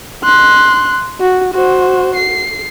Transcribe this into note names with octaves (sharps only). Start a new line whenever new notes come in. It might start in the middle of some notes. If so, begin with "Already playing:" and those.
C6 F#6
F#4
F#4 C5
C7